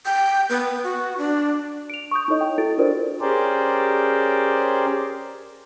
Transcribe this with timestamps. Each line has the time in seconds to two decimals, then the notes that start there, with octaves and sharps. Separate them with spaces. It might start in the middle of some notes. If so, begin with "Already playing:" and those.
0.06 G5
0.50 B3
0.83 F#4
1.18 D4
1.90 D7 F7
2.11 C#6 D#6 G6
2.28 D#4 E4 A4 C#5 D#5
2.41 G5
2.58 E4 F#4 A4 A6 D7
2.78 D4 F4 F#4 A#4 C5 D5
3.21 C#4 G4 G#4 A#4 C5 D5